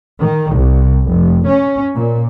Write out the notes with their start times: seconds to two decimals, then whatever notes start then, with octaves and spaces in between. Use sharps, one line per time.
0.20 D#3
0.53 C2
1.08 F1
1.46 C#4
1.94 A#2